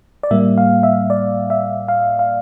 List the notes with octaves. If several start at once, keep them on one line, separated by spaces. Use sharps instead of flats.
D5
A2 G3 A#3 E5
F5
E5
D5
E5
F5
F5